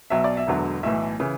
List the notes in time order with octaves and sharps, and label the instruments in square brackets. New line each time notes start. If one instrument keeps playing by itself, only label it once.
[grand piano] B1 B2 F#3 E5
D5
E5
E1 E2 D3 F#3
B1 A2 E3 E5
C#3 E3